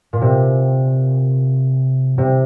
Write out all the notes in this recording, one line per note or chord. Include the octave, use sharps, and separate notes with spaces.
A#2
C3
C3